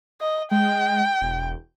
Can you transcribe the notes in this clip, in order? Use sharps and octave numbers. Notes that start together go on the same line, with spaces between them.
D#5
G#3 G5
E1